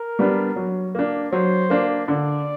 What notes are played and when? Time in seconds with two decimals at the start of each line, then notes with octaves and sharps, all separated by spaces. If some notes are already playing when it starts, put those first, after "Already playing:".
Already playing: A#4
0.19 G3 B3 D4
0.56 F#3
0.95 A#3 D4
1.32 F#3 C5
1.70 A#3 D4
2.08 D3 D5